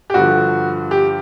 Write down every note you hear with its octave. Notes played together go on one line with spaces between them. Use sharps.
G4
G2 D3 F3 F#4
G4